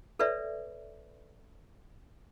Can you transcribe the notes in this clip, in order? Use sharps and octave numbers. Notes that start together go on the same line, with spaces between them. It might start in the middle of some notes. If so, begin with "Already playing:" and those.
A4 B4 C#5 D5 E5